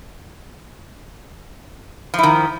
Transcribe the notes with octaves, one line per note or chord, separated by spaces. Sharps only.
D#3 F3 E4